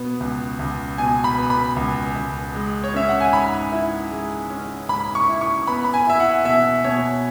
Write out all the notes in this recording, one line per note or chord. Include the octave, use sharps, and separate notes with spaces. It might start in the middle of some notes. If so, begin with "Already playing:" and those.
Already playing: B2 B3
C#2
C#2
B2 G#5
B5
B3
B5
C#2
C#2
G#3
C#5
C#4 E5
F#5
G#5
G#2 B5
E4
G#3
C#4
G#2 B5
C#6
E4
C#6
B3 B5
B5
G#5
E4 E5
F#5
B2 E5
B2 C#5